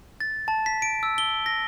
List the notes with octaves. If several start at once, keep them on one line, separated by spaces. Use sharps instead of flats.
A6
A5
B6
D7
E6
G7
A#6